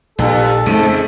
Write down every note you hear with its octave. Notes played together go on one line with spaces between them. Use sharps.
A#1 G2 A4
F2 G#2 C#3 A3